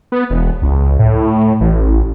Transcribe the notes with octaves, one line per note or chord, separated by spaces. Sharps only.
B3
E1
C#2
A2
A1